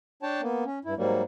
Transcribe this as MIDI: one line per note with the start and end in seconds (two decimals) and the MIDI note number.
0.23 0.41 62
0.23 0.41 73
0.23 0.41 79
0.23 0.41 81
0.41 0.64 58
0.41 0.64 59
0.65 0.79 61
0.85 0.94 43
0.85 0.94 64
0.97 1.23 44
0.97 1.23 54
0.97 1.23 55
0.97 1.23 58